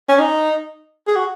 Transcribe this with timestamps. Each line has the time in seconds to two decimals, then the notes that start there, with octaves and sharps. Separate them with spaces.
0.08 C#4
0.19 D#4
1.07 G#4
1.16 F#4